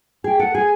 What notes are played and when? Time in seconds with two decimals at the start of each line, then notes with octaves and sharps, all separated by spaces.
0.24 G#4 G5
0.40 A4 F#5
0.54 G#4 G#5